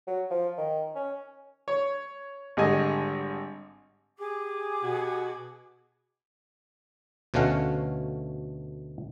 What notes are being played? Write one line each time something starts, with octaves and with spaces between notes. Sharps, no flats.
F#3
F3
D#3
C#4
C#5
G#1 D3 G3 D#5 G#5
G4 G#4 D6
B2 F#4
D2 B2 A3 C#4 F5 F#5